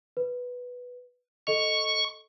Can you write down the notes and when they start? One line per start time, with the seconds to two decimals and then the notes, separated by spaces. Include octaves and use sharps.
0.17 B4
1.47 A4 D#5 C#6 F7